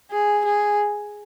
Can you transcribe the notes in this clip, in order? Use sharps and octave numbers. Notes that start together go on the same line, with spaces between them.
G#4
G#4